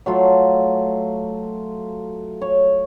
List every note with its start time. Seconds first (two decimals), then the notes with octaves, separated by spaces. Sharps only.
0.06 F#3 A3 F4
2.41 C#5